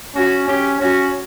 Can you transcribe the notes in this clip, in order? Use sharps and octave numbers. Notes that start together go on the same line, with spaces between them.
C#4 F#4
C#4 G4
C#4 F#4